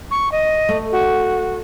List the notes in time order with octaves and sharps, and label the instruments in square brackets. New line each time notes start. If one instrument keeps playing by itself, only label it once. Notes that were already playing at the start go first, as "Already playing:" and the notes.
[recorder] C#6
D#5
[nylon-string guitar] A3
[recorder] F#4